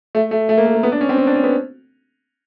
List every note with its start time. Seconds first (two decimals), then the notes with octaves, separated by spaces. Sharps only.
0.15 A3
0.31 A3
0.49 A3
0.57 A#3
0.66 A3
0.75 A#3
0.83 B3
0.92 D4
1.01 C#4
1.09 C4
1.18 C#4
1.27 D4
1.35 C#4
1.43 B3